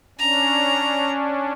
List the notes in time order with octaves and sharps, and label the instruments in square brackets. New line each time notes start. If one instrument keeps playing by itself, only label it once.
[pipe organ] C#4 D4 [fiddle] A#5